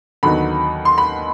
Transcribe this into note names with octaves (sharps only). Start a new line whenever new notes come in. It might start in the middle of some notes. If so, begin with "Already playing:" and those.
D#2 D3 F#3 B3 D#4 B5
C6
B5